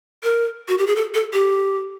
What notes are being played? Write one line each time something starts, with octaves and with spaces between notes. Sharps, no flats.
A#4
F#4
G4
G#4
A4
A4
G4